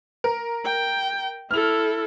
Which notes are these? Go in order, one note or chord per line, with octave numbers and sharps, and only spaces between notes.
A#4
G5
E4 A4 F6 F7